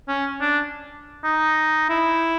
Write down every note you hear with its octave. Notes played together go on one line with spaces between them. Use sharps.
C#4
D4
D#4
E4